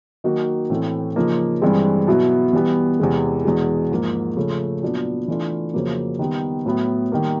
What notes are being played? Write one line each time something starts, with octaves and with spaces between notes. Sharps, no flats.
D#3 F#3 A#3 D#4 F#4
A2 E3 A3 C4
C#3 F3 A#3 D#4
G2 E3 G#3 C4
B2 F#3 B3 E4
E3 G3 B3
E2 C3 E3 G#3
E2 B2 G#3
G#2 F3 A#3
C#3 F3 A3
A#2 F#3 B3 D4
E3 A3 D4 F4
F2 C#3 F#3 A#3
D#3 G3 B3
A2 F#3 B3 E4
D#3 G3 A#3